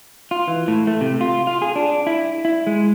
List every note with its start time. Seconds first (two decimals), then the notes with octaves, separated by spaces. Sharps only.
0.31 F4
0.48 E3
0.68 A2
0.87 A3
1.01 C3
1.21 F4
1.47 F4
1.62 G#4
1.76 D4
2.07 E4
2.45 E4
2.67 G#3